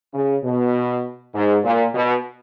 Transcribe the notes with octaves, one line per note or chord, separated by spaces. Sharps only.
C#3
B2
G#2
A#2
B2